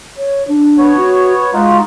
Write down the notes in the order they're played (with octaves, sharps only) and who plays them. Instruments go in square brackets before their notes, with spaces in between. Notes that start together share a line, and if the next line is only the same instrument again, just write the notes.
[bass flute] C#5
D4
[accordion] B3 C#5
[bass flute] F#4
[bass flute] G#3 [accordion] D#4 F4 F#4